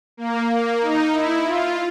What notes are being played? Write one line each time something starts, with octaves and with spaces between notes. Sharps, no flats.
A#3
A#3
D#4
E4
F4